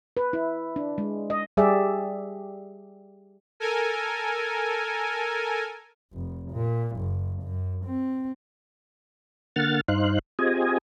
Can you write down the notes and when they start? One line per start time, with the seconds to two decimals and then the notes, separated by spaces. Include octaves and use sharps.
0.17 B4
0.33 E4
0.76 D4
0.98 G#3
1.30 D#5
1.57 G3 G4 G#4 D5 E5
3.60 A4 A#4 G#5
6.13 F1
6.52 A#2
6.97 F#1
7.43 F#2
7.86 C4
9.56 D3 A#3 F#5 F6 A6
9.88 G2 D#4 C5 F5 F#6
10.39 C4 F4 G4 G#4 D#5 G#5